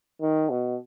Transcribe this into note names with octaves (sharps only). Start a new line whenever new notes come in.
D#3
B2